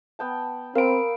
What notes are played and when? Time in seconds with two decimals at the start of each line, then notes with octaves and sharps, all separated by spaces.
0.19 B3 G5 A5
0.75 C4 A#4 F5 B5 D7